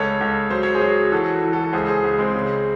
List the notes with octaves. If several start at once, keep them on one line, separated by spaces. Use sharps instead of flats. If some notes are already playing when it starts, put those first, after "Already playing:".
Already playing: C#2 A4 C#5
C#2
F#3 C5
C#5
G#4 C5
F#3
E3 F#4 A4
E3
F#4 A4
A4
C#2 G#4 C5
G#4 C5
C#2
G#3 C4
C#3